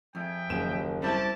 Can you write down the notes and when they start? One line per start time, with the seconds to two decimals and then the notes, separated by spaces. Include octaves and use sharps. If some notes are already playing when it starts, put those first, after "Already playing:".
0.15 F2 G#4 E5 G5
0.49 F#1 D#2 E7
1.02 G3 C4 E4 G4 D5 A5